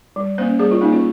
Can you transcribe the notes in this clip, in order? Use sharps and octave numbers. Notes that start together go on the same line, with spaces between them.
G3
A#3 C#4 C5
G3 G#4
F4
A#3 C#4 D#4
F4